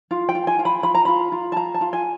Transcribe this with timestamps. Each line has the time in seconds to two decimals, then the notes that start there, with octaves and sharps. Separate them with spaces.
0.11 F4
0.29 G5
0.35 F4
0.47 G#5
0.59 F4
0.65 B5
0.83 F4 B5
0.95 A#5
1.05 F4 B5
1.32 F4
1.52 A5
1.56 F4 A#5
1.74 A5
1.81 F4
1.93 G#5